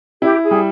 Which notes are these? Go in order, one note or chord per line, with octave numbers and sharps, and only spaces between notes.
E4 G4
G#4
G3